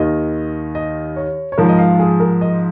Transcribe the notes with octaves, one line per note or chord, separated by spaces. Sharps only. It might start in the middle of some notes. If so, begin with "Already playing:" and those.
Already playing: D#2 D#3 D#5
D#5
C#5
C#5
G#2 F3 A#4
D#5
F5
G#4
A#4
D#5